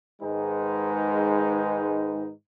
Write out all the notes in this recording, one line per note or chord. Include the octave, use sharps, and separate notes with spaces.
G#2 D#3 G#3 D#4 B4